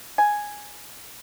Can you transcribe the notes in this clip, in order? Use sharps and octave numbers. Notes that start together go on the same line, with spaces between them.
G#5